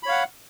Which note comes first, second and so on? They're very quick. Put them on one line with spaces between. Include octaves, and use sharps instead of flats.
B5 C#5 F5 F#5